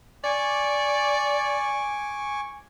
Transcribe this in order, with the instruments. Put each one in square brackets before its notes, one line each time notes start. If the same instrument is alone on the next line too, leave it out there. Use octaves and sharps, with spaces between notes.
[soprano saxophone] D5 [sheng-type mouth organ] G#5 C#6 D6